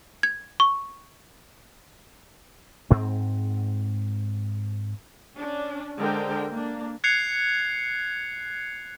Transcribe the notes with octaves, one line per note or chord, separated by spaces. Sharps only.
G#6
C#6
G#2 C4
C#4 D4
D3 G#3 A#4 C5 G5
A#3 D4
F#6 G#6 C7 C#7 F7